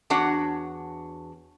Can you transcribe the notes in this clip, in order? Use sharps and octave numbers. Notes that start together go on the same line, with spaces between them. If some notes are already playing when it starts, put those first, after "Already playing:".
E2 D4 F#4 C#5 F#5